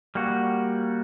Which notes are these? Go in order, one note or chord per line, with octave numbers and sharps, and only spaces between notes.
G3 A#3 F#4